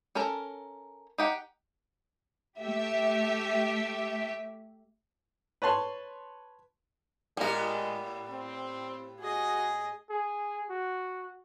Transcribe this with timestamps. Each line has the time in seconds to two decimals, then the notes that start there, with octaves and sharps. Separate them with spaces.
0.15 C#4 A4 A#4 A#5
1.18 D#4 G4 F#5
2.60 A3 G4 E5
5.62 B4 C#5 A5 C6
7.37 A2 G3 G#3 B3 G4 A#4
8.30 C4
9.19 F#4 G#4 D#5
10.10 G#4
10.70 F#4